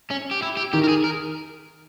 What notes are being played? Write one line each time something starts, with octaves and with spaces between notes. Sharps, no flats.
C#4
G4
E4
G4
D#3 G4
A#4
G#4
A#4